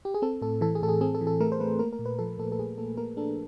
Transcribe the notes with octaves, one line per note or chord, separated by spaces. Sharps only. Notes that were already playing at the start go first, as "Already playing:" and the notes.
G4
G#4
C4 A4
A2 A4
E3 A4
G#4
A2 A4
G#4
C4 G#4
A4
E3
A4
A3 A#4
C5
A3 B4
A#3 A#4
A#4
A#2
B4
F3 A4
A#2 A4
A4
A#2 G#4
A#3 A4
A#3 A#4
D4 A4